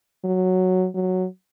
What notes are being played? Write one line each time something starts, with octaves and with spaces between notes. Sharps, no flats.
F#3
F#3